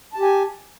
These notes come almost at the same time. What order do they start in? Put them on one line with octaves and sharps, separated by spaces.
A5 G4 G#5